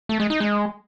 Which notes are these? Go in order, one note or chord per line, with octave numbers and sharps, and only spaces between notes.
A3
G#3
D#4
G#3